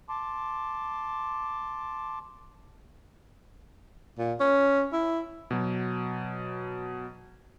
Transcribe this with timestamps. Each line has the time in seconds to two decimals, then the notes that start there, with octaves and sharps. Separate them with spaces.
0.09 A5 C6 D6
4.19 A#2
4.40 C#4
4.93 E4
5.51 B2 F#3